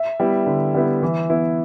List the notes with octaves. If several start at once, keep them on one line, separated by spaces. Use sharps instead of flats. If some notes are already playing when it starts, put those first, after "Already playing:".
Already playing: E5
G3 B3 E4
D3
G3 B3 E4
E3
B3 E4